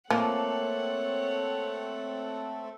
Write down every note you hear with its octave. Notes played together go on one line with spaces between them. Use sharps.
F3 A3 A#3 C4 A4 C#5 F#5